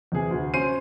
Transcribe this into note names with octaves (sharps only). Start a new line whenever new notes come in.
E2 C3 G#4
D2
C#4 C5 C7 D#7